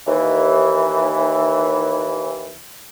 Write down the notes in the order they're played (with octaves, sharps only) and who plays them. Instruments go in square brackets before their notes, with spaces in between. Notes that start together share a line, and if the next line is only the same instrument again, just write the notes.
[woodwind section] D#2 E3